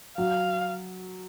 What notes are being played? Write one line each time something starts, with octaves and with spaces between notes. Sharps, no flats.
F#3 F5